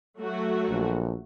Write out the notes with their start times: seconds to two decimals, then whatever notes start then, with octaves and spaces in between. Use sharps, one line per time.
0.19 F#3 A3 F#4
0.69 A#1